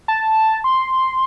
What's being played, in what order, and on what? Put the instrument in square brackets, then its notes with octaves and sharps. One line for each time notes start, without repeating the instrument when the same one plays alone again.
[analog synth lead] A5
C6